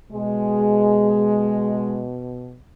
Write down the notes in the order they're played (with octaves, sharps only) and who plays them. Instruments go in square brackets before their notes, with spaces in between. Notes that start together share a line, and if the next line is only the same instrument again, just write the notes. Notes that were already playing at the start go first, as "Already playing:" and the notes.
[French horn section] B2 G#3